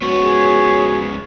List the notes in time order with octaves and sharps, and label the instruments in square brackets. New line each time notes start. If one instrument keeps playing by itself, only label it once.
[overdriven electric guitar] C#2 B3 [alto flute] F#4 [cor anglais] C#5
[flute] G#4